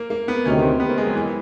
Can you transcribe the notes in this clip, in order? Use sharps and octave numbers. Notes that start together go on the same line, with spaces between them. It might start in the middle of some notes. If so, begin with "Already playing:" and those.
Already playing: A#3
A#3
B3
D2 C3 D#3 C#4
C4
B3
A#3
G#3
F#3
E3